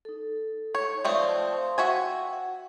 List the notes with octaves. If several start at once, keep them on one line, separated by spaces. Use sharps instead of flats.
D#4 A4
C#5
F3 A3 C4 D5 E5 D#6
C5 F5 C6
F#4 E5 G5 G#5
F#5